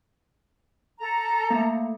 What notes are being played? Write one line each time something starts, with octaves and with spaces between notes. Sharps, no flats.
A4 A#5
A3 A#3